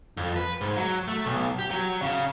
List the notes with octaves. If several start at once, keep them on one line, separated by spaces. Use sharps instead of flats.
F2
B4
G#2
F#3
A3
B1
G4
F#3
C#3